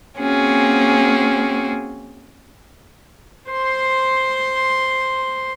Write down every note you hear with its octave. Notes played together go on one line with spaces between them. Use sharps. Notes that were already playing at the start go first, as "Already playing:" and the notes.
A#3 C4 C#4 F#4 G#4
C5 C6